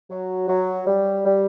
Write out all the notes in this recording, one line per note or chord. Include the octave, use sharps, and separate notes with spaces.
F#3
F#3
G3
G3